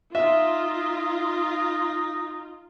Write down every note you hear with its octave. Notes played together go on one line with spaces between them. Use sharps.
D#4 F4 E5